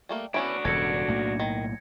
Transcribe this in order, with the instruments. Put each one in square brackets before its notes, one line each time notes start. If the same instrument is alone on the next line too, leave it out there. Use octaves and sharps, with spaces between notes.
[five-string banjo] G3 A3 A#3
[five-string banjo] B3 C#4 E4 [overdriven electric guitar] D4 F#4
[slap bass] E1 G2 C#3 [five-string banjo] A4 [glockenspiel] G#6 A#6 C#7
[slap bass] B1 A2 A#3
[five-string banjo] D#3